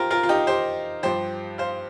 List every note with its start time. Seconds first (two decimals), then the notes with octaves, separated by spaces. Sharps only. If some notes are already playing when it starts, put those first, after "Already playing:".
Already playing: F4 G4 A#4 C5
0.11 F4 A#4
0.23 F4
0.29 D#4 G4
0.47 G4 C5
1.03 G2 F3 G4 C5
1.58 C5 F5